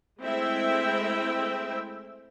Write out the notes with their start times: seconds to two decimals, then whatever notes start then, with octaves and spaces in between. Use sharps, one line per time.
0.21 G#3 A3 C4 E4 E5 G5